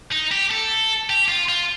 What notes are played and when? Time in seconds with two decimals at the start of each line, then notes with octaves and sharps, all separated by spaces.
0.12 D#4
0.32 G4
0.51 A4
1.10 G4
1.28 F4
1.49 F4